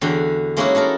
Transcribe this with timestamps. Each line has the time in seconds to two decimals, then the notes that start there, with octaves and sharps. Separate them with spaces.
0.01 E2 D3 F#4 G5
0.57 G#3 A#3 C#4 D#4 E4 F#4
0.75 D#4 E4 A4 A#4